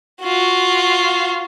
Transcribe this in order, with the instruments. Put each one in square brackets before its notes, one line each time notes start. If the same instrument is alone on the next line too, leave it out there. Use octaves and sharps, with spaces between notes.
[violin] F4 F#4